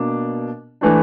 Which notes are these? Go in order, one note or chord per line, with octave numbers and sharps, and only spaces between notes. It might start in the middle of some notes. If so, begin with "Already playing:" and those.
Already playing: B2 A#3 D4
E3 A3 D4